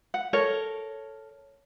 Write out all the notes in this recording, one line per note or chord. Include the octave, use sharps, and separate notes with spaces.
F#5
A4 A#4 C#5